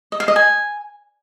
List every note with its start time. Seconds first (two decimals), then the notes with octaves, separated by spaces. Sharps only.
0.12 D#5
0.20 F5
0.28 D#5
0.36 G#5